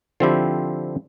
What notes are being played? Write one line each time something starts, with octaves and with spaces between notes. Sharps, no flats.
D3 F3 C4 E4 G4